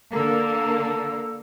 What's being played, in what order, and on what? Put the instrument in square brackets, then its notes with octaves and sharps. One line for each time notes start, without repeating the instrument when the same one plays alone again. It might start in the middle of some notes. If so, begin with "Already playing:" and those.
[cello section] D3 A#3 [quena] A4